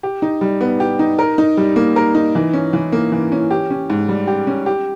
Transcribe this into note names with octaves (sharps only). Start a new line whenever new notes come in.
G4
D#4
G3
B3
G4
D#4
A#4
D#4
G3
A#3
A#4
D#4
E3
C#4
E3
A#3
E3
C#4
G4
C#4
G#2
G3
G4
C#4
G4